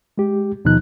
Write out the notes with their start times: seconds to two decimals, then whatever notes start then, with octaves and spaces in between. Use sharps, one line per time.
0.18 G#3 G4
0.65 D#2 B2 F3 D#4 F#6